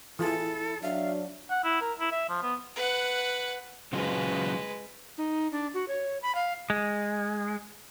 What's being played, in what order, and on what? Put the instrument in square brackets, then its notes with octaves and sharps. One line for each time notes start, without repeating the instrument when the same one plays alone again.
[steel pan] E3 F4 G#4 [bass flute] E4 [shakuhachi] A4
[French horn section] F#3 D4 [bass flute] E5 [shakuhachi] F5
[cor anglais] F#5
E4
A#4
E4
E5
F3
B3
[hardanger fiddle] B4 F#5
[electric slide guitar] C#3 F#3 F4 [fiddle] G#3 B4
[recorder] D#4
D4
F#4
C#5
B5
F5
[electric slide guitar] G#3